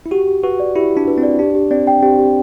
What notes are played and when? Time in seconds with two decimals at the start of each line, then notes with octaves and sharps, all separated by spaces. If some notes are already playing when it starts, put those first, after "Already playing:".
0.06 E4
0.11 F#4 G4
0.27 G4
0.43 F#4 B4
0.60 D5
0.76 E4 G4
0.91 G4
0.97 D4
1.07 B4
1.18 C4
1.23 D5
1.39 D4 G4
1.55 G4
1.71 C4 D5
1.87 G5
2.02 C4 G4
2.19 G4